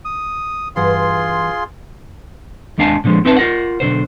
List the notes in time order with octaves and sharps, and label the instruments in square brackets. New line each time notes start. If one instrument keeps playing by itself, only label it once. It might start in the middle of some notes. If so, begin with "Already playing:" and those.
[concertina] D#6
[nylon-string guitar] G2 E3 F#5 [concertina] F4 G#4 C6
[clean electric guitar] D#2 G#3 D4 F5 G#5 A5
A#2 D3 F3 G#3
C4 D#4 B4 E5 G#5 A5
F4 A#4 F#5
B1 A#2 D3 C5